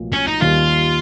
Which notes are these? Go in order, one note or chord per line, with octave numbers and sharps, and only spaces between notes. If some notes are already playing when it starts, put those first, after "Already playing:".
Already playing: B1 A2 F3 A#3
C#4
D#4
D#2 D#3 G3 F4